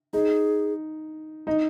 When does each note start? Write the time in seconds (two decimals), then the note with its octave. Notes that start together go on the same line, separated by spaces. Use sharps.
0.13 D#4 G#4
1.47 D#4